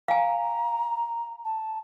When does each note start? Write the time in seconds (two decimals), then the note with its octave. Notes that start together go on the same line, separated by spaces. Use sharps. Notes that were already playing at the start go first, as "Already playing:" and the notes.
0.08 F5 G#5 A#5
1.44 A5